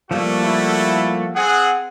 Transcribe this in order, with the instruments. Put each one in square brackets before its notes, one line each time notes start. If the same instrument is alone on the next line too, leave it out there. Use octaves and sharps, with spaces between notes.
[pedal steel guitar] F3 G3 A#3 [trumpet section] A3 F#4 A4
[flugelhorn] E4
[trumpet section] C4 G#4 [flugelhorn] F#5